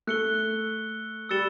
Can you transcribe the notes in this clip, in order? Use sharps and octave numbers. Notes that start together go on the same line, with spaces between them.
A3 F#6 C#7 G7
G3 E6 A6 C#7 E7 G7